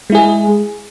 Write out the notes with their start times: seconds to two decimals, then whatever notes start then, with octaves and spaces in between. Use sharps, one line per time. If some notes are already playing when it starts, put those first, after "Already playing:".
0.10 G#3
0.12 E4
0.15 G#4